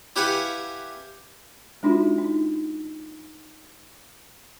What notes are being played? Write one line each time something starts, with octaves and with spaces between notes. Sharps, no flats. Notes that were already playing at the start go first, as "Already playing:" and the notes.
E4 G4 B4 F5 F#5 G#5
G#3 D4 D#4 F4 F#4
D#4